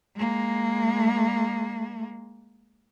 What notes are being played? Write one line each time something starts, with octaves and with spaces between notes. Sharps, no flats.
G#3 A#3